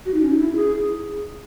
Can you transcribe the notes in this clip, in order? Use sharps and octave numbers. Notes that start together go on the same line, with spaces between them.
F#4
D#4
C#4
D#4
E4
G#4